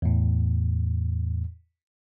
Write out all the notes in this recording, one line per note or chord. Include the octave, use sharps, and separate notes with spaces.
E2 A2